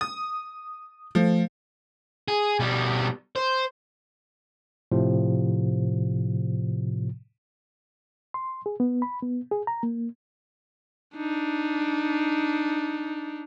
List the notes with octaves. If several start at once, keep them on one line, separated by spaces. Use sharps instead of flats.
D#6
F3 A3
G#4
B2 G3
C5
A2 C3 F3
C6
G#4
B3
B5
B3
G#4
A#5
A#3
D4 D#4